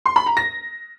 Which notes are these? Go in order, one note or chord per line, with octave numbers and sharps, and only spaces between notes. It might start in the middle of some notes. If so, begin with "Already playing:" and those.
C6
B5
A#5
A#6